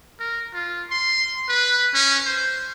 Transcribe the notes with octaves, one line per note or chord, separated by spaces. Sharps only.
A#4
F4
C6
B4
C#4
C5